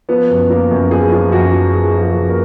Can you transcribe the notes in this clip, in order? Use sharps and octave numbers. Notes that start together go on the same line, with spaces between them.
F3 B3 B4
F#2
F3 A#3 A#4
F#2
F3 G#4
F3
F#2 F#4
F3
F3 G#4
F3
G#4
F#2
A#3 A#4